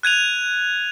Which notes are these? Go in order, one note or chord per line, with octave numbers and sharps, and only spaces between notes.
F#6 G#6 D#7 F7